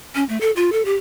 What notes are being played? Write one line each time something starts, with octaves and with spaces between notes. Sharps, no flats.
C#4
A3
A4
F4
A4
G4